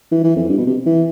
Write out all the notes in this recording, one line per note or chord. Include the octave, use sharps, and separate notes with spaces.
E3
E3
F2
G2
B2
C3
E3